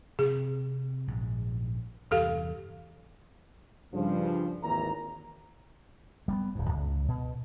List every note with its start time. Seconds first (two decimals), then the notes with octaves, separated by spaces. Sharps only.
0.19 C3 C4 G#4
1.08 A#1 G#2
2.11 E2 G2 C3 G4 A4 F5
3.93 G2 C#3 F3
4.63 G#1 D#2 D#3 E3 A#5
6.28 G3 A#3 B3
6.55 D1 G2
6.69 C#2
7.08 B2